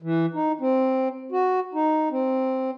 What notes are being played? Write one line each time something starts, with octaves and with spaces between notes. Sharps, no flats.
E3
D#4
C4
F#4
D#4
C4